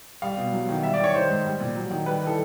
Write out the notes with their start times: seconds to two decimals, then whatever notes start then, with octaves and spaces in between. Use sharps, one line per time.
0.22 G3 F5
0.37 B2
0.52 F#3
0.69 D#3
0.83 G3 E5
0.94 D5
1.00 D#3 C#5
1.14 D#3 C5
1.30 G#2
1.45 G3
1.60 A#2
1.75 F#3
1.91 D#3
2.06 G3 B4
2.22 E3 A4